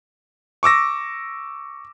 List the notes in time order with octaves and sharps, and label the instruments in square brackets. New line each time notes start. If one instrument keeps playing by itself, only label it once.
[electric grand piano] C#6 D6 E6 A#6